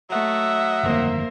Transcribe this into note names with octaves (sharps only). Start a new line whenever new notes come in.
F#3 A3 D#5 E5 F#5
G1 F2 D#3 A#3 A#4 C5